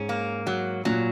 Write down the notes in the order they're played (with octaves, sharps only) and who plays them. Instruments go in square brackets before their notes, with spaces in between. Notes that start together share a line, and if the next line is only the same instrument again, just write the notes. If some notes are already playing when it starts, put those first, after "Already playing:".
Already playing: [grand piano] G#2 [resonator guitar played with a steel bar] C#4
[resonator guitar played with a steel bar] A#3
F#3
[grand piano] A#2 [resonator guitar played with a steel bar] F#3